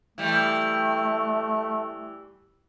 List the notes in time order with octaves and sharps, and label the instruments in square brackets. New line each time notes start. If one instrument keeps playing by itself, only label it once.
[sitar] E3 G3 [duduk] A3